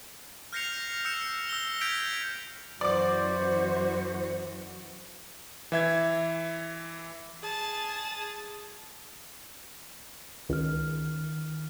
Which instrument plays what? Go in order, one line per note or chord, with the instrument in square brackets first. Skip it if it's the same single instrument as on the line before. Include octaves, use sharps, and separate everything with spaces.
[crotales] F6 G6 A#6 C7 C#7 F7
E6 G6 C#7 E7
E6 A#6 G7
E6 G6 G#6 B6 D7 F7
[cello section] F#2 E3 F#4 [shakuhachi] C5 [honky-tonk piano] D5 D6
[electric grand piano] E3 E5 G#6
[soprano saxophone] G#4 [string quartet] A5
[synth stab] C#2 [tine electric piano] D#3 F6